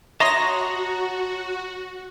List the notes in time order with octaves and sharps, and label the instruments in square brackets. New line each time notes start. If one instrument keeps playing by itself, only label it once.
[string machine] F#4 [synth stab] C#5 A#6 [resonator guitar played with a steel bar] D#5 [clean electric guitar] A5 A#5 C6